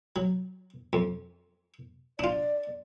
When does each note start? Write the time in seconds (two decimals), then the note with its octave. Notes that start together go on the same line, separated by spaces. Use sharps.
0.16 F#3
0.93 F2
2.19 D4 F4 D5